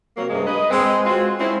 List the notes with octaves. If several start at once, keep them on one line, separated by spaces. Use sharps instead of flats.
C3 F#3 A#3
G2 C3 G#3 A#3
B4 D#5
G#3 C4
G#3 C4 F4 F#4
G#3 C4 C#4 E4